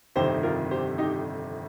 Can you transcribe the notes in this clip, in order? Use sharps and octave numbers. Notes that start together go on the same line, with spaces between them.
G1 F2 C3 D#3 G4 C5
F4 A#4
G4 C5
D#4 G4